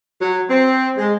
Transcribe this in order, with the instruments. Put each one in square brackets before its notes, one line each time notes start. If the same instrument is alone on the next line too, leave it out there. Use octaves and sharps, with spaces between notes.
[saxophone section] F#3
C4
G#3